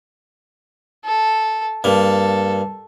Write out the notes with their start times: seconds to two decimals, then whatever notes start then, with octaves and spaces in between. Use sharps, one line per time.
1.05 A4
1.84 G2 A#3 A4